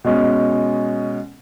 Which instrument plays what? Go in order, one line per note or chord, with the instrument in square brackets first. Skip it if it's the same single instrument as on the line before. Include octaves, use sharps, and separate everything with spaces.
[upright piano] B2 G#3 C#4